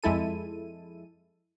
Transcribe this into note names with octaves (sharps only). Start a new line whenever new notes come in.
F2 G#3 E4 A4 D#7